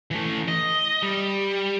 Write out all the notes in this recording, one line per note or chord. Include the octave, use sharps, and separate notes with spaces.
E3 A3
D#5
G3